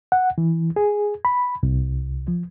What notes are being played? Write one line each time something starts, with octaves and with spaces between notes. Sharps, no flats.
F#5
E3
G#4
B5
C2
F3